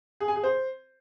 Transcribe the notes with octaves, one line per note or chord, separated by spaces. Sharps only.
G#4
G#5
G#4
C5